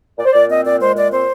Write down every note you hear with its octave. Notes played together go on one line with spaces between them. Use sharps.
A#2 D5
C5
A#2 D5
C4 D#5
A#2 D5
G#3 C5
A#2 D5
C4 C5